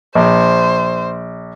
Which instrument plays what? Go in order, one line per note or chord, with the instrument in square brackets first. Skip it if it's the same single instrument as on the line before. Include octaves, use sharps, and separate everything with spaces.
[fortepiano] A#1 [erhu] C5